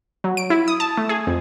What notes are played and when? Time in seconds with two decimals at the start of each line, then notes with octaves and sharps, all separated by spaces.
0.24 F#3
0.37 D7
0.50 E4
0.68 D#6
0.80 A5
0.98 A3
1.09 G#4
1.27 F2